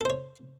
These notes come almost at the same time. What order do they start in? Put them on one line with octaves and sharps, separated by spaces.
A4 C5 C#5